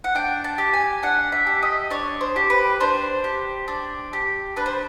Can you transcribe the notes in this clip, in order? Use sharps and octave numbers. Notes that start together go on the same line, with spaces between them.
F#5
D4 G5
A5
G4
G#5
D4 F#5
E5
G4
D#5
D4 C#5
C5
G4
B4
D4 C5
G4
D4
G4
D4 B4
C5